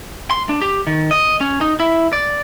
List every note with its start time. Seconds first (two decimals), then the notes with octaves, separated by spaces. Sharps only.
0.31 C6
0.49 D4
0.62 G4
0.87 D#3
1.11 D#5
1.41 C#4
1.61 D#4
1.80 E4
2.13 D5